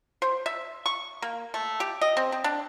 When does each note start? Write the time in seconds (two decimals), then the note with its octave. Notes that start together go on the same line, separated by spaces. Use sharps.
0.22 C5
0.46 E5
0.86 C#6
1.22 A#3
1.54 A3
1.80 G4
2.01 D#5
2.17 C4
2.32 C4
2.44 D4